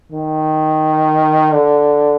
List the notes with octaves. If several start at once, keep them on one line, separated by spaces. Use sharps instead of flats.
D#3
D3